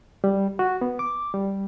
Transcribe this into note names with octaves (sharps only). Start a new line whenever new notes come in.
G3
F#4
B3
D6
G3